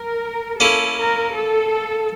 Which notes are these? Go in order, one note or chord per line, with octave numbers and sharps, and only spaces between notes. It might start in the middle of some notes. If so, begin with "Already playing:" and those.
Already playing: A#4
A#3 C#4 E4 A4
A#4
A4